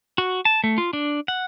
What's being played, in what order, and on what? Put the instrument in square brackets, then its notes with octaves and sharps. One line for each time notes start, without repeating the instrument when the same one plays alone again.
[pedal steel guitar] F#4
A5
A3
F4
D4
F#5